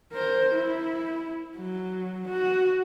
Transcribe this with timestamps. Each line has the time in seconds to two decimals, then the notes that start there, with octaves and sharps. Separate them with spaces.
0.13 A#4 C5
0.52 E4
1.57 F#3
2.29 F#4